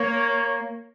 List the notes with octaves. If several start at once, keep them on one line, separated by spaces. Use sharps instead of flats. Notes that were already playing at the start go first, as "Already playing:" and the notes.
Already playing: A#3 C#5